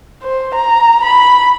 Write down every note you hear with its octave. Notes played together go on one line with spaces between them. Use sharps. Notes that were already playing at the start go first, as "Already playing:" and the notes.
C5
A#5
B5